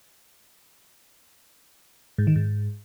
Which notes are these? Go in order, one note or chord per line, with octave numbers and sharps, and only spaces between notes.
G#2
D#3
G#2